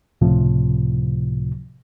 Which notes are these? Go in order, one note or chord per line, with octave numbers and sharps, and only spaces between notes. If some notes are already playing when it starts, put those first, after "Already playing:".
C#2 A2 C3 F3